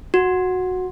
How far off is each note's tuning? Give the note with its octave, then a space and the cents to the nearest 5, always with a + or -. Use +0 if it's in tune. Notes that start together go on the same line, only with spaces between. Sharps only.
F#4 -10